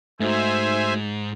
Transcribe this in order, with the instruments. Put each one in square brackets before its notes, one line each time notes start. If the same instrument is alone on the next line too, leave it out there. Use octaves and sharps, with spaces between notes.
[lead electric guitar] G#2 [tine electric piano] A3 D#4 F#4 [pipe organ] C5 E5 G#5